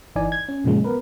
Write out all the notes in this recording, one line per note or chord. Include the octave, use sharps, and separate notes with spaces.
G1 E3 D#4 D5 G#5
G#6
C#4
F#2 A#2 C#3 F3 G#3
B3 A#4 B4